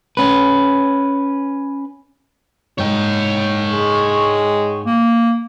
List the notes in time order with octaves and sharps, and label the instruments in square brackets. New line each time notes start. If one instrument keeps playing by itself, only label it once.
[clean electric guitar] C#4 B4
[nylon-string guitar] G#2 [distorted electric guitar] C#5 G5
[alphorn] G#3
[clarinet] A#3